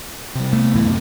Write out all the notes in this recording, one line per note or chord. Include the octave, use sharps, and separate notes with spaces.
C3 G3
A3 B3
C#2 A2 E3
F#2 C3